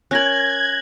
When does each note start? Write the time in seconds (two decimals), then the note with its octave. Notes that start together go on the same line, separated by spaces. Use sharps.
0.11 C#4 A#4 F#6 G#6 A#6 F#7